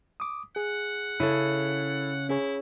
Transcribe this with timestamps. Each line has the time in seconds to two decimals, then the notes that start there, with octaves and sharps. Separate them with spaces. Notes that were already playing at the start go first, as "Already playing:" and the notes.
0.20 D6 D#6
0.56 G#4 F#5
1.20 C#3 E4 A4
2.29 C#4 E4 G#4 C#5